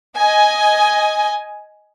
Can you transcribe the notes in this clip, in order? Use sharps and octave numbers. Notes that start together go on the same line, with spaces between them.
D#5 G#5